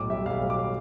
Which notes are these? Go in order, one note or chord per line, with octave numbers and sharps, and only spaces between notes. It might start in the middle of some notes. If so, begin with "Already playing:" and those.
Already playing: B1 A2 D6
G3 E5
B1 F5
A2
D6